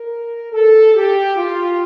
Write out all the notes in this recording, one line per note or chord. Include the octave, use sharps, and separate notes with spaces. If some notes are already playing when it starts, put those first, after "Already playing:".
Already playing: A#4
A4
G4
F4